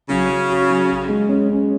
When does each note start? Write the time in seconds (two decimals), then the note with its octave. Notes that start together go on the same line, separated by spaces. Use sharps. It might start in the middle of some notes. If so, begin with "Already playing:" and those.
0.09 C#3 F#3 C#4
0.29 F#3
0.50 F#4
0.70 F#3
0.89 F#4
1.09 G#3
1.29 C#4
1.49 C#4